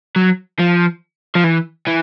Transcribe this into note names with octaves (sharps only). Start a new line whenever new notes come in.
F#3
F3
F3
E3
E3